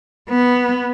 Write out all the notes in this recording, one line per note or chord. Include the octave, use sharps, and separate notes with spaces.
B3